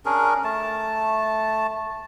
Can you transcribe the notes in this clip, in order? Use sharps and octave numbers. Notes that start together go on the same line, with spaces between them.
C#4 D4 G#4 A#4
A3 A5